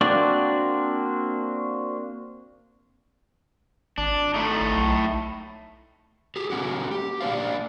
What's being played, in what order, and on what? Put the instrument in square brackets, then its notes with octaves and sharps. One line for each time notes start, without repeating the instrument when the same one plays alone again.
[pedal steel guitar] A#3 C4 D4 F#4 D5
[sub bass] G#1 [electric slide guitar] D4
[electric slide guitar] A2 A3 D#4
[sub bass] B1
[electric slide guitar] G4 G#4
A#3 C#4 D#4 F#4 G4
G4
A#3 D4 C5 F5